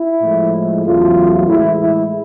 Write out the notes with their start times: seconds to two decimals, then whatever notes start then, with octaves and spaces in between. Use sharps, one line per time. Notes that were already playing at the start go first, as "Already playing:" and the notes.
Already playing: E4
0.22 A2 F3 G#3
0.85 E2 C#3 F#3 A3 F4
1.48 A2 E3 G#3 E4
1.80 E4